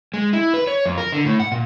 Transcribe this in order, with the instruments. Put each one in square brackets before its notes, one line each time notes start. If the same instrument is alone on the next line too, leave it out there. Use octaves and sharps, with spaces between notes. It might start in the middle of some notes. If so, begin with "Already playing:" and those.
[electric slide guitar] G#3
E4
B4
C#5
F2
A#4
D3
A2
F#5
A#2